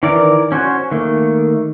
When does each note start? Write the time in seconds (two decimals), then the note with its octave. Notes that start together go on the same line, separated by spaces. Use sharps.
0.03 D#3 E3 A#4 D5
0.52 C#4 F#4 C5 G#5 F#6
0.92 D#3 A3 A#3